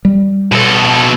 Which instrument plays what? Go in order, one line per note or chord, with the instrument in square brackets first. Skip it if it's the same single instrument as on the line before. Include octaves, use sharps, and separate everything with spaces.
[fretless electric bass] G3
[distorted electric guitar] B2 A4